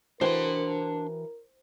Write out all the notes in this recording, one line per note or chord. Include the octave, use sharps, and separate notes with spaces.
E3 D4 F#4 A#4 C5 G5 C6